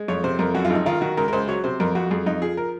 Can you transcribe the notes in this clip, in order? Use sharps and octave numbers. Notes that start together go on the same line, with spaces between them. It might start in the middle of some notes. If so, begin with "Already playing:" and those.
Already playing: G#3
F2 C#5
C3 C5
F2 A#4
F#2 F#4
F4
G#1
D#4
D#3 F4
D#3 F#4
C#2 A#4
A#4
C#2 C5
F#3 C#5
C3 C5
F2 A#4
F2 F#4
F2 G#4
F2 D#4
F3 G#4
A#4